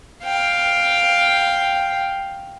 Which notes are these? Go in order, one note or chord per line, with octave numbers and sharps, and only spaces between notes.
F5 G5